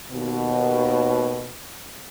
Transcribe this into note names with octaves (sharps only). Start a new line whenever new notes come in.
D#2 B2